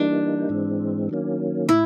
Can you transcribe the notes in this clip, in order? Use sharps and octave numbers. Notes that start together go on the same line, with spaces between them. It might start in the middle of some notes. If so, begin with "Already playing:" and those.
Already playing: E3 G3 A#3 D4 D#4
G#2 E3 G#3 C4
D#3 F#3 A#3 C#4
A2 E4